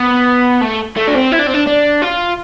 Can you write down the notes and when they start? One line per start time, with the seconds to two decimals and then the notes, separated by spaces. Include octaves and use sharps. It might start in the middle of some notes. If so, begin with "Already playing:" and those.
Already playing: B3
0.61 A3
0.96 A3
1.08 D4
1.15 C4
1.32 E4
1.39 D4
1.47 C4
1.54 D4
1.67 D4
2.02 F4